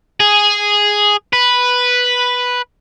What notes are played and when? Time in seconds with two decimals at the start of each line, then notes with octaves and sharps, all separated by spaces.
0.20 G#4
1.33 B4